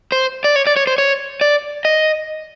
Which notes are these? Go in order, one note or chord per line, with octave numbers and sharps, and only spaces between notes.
C5
D5
C#5
D5
C#5
C5
C#5
D5
D#5